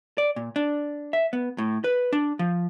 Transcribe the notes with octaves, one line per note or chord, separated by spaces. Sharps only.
D5
A#2
D4
E5
B3
A2
B4
D4
F3